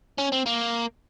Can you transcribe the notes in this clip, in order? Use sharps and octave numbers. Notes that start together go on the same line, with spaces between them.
C#4
C4
A#3